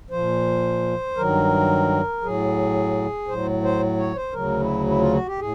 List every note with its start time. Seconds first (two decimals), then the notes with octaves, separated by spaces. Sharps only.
0.10 A#2 F3 C5
1.16 G2 D#3 F#3 A#4
2.22 A2 F#3 G#4
3.28 A2 F#3 C5
3.63 C5
3.98 C#5
4.16 C5
4.33 D2 C#3 F#3 A#4
4.60 E4
4.87 E4
4.99 F4
5.13 F#4
5.26 G4
5.39 A2 G#4